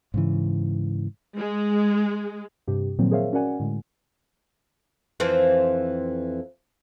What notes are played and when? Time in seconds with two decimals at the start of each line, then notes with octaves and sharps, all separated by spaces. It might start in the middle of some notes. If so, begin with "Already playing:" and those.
0.14 G#2 C#3 E3
1.37 G#3
2.67 G2 C3 G4
2.99 A#2 D#3 F3 F#3 A#3 C4
3.11 G#4 A#4 C5 C#5 E5 F5
3.33 C#4 F#4 A#4 D5 F#5 G#5
3.60 A2 D3 G#3
5.20 F2 E3 C4